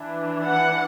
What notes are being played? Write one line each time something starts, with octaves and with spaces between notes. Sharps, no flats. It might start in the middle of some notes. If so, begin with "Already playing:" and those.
Already playing: E3 D4
F#5